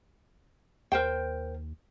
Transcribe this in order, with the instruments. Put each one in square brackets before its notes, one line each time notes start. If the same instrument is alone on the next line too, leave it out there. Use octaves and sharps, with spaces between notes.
[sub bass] D#2 [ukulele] A#4 C5 G5